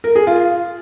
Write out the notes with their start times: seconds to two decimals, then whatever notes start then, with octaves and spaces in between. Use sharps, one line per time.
0.04 A#4
0.15 G#4
0.27 F4